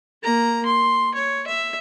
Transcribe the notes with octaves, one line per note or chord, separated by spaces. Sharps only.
A#3 A#5
C6
C#5
E5